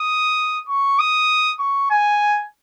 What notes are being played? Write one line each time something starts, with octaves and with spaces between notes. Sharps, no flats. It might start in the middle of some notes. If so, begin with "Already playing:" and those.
Already playing: D#6
C#6
D#6
C#6
G#5